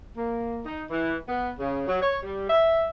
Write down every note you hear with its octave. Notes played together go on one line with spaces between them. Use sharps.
A#3
D#4
E3
B3
C#3
F#3
C#5
G3
E5